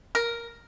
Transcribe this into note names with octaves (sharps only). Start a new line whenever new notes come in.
A#4